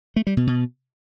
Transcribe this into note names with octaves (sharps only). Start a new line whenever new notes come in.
A3
G3
B2
B2